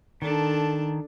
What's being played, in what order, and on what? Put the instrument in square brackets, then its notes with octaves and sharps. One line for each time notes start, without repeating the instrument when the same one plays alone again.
[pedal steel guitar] D#3 [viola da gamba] D4 A4